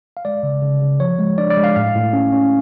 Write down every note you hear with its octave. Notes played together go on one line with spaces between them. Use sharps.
F5
G#3 D5
C#3
C#3
C#3
F3 C#5
G#3
D4 D5
D5
G#3
F5
A2 F5
A2
C#4
C#4